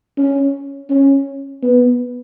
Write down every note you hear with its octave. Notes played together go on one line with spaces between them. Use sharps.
C#4
C#4
B3